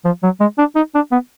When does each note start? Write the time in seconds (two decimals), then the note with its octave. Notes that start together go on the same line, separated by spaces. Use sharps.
0.05 F3
0.23 F#3
0.40 G#3
0.58 D4
0.76 D#4
0.95 D4
1.12 B3